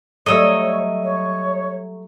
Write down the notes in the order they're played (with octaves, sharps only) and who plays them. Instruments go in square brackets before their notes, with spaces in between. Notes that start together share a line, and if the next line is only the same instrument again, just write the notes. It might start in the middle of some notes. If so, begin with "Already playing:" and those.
[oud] F#3 G3 A3 [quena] C#5 [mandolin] D#5 E6
[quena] C#5